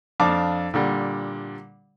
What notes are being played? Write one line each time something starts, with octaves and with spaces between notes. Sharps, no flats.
F2 D4 F5 A5 D6
A#2 D3 G3